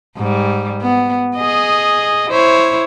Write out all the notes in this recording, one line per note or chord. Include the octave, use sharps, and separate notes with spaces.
G#2 G3
B3
G#4 D#5
E4 C5 C#5